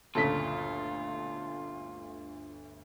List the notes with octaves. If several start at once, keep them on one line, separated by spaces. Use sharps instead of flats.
G1 D2 A#2 C#3 F4 A4 D#6 B6